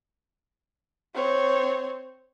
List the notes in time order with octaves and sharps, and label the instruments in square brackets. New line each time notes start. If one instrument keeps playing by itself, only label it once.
[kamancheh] C4 C#5